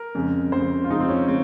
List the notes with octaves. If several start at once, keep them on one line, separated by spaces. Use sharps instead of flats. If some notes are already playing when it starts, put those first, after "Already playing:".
Already playing: A#4
F2 C#3 G#3
F2 C#3 G#3 C5
F4
F2 C#3 G#3 D#4
C4
C#4
C#3 G#3 C4